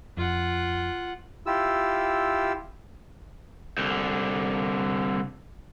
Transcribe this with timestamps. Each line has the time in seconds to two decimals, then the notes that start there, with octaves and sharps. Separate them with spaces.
0.17 F2 F4 F#5
1.46 E4 F4 G4 E6
3.78 C2 D3